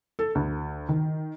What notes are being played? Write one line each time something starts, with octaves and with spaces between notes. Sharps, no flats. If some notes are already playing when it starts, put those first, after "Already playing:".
A4
D2
D#3